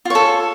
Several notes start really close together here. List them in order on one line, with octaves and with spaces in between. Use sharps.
F4 C#5 A4